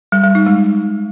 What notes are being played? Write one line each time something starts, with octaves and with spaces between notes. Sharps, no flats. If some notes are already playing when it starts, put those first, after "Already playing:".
G3
G3
D#4
G#3